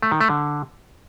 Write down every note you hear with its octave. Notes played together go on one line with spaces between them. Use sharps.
A3
D#3
A3
D3